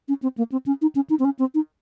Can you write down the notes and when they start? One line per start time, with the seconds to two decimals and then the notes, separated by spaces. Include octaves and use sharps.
0.08 C#4
0.23 C4
0.38 A#3
0.52 C4
0.66 C#4
0.82 D#4
0.95 C#4
1.10 D#4
1.19 C4
1.25 C#4
1.39 C4
1.54 D#4